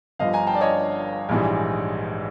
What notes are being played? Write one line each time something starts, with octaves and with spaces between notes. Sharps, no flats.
G1 G2 D3 F3 D#5 F5
G#5 A#5
G5 A5
D5
C#5 D#5
A#1 G#2 E3 G3